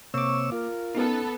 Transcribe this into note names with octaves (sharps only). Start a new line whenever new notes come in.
C3 A#3 C#5 C#6 D6 E6
F4 A#4
B3 C#4 D#4 A4